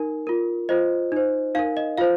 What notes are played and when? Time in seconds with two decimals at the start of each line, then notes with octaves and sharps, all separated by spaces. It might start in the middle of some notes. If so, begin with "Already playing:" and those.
Already playing: D#4 A#4
0.27 F4 A#4
0.69 F4 C5 D#5
1.12 D#4 C5
1.55 D#4 A#4 F5
1.77 D#5
1.98 F4 C5 F5